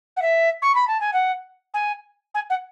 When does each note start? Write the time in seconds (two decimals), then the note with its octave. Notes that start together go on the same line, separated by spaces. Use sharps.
0.16 F#5
0.22 E5
0.62 C#6
0.75 B5
0.87 A5
1.00 G#5
1.13 F#5
1.74 G#5
2.34 G#5
2.50 F#5